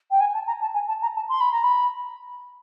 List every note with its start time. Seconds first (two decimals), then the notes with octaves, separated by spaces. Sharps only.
0.11 G5
0.20 G#5
0.34 A5
0.47 A#5
0.61 A5
0.74 G#5
0.88 A5
1.02 A#5
1.16 A5
1.29 C6
1.40 B5
1.52 A#5
1.63 B5